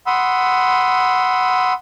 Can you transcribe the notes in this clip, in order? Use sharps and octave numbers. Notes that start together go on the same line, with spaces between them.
F#5 B5 C6 D#6 E6